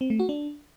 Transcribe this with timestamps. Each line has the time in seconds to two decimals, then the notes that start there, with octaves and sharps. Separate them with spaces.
0.01 C4
0.10 A3
0.20 F#4
0.29 D4